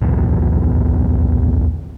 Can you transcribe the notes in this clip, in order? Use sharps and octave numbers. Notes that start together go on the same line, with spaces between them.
D1 B1 E2 B2